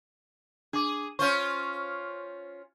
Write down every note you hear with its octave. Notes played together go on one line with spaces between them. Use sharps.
D4 G#4 D6
C#4 F4 C5 C#6